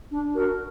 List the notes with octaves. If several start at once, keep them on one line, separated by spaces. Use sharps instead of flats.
D4
F#4 A#4